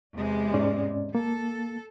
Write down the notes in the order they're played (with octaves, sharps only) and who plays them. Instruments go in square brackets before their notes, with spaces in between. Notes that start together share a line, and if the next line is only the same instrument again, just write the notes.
[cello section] E2 C3 G#3
[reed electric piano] G#2 C#4 D5
[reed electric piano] A#3 [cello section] A4